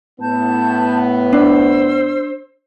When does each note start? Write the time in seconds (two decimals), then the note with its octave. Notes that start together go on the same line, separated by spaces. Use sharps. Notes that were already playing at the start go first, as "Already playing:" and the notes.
0.20 A2 B3 E4 A5 G6
1.33 D4 C5 E6